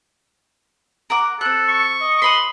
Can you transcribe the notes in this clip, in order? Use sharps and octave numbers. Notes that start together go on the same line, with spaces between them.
A#4 F#5 D6
C4 A4 F#6
C#6
D#5
B4 B5 C6 D#6